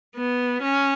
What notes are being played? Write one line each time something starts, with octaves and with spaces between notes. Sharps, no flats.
B3
C#4